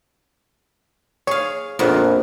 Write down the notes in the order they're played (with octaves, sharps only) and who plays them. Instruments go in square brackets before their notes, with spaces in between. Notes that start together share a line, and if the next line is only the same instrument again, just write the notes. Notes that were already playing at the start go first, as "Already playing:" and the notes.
[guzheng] G#4 F5 [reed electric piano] C#5
[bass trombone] A#1 [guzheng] F2 A#2 B3